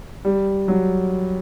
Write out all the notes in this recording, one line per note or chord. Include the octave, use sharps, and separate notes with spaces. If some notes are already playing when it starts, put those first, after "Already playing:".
G3
F#3